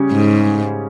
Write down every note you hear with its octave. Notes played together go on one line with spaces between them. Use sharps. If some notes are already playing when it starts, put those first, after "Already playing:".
Already playing: C#3 G3 C#4 G#4
G#2